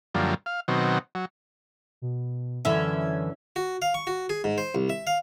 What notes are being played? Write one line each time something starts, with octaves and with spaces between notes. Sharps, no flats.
F#2 D3 F3 G3 A#3
F5
B2 D#3 F#3 C4
F#3
B2
F#2 D3 E3 C#4 E5 G#6
F#4
F5
C#6
F#4
G#4
G#2
C5
C2
E5
F5